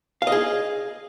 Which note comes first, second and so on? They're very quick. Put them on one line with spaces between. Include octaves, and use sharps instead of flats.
F5 D#5 G#4